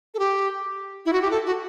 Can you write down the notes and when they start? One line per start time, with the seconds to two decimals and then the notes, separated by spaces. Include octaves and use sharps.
0.14 A4
0.19 G4
1.06 E4
1.13 F#4
1.22 G4
1.31 A4
1.46 F#4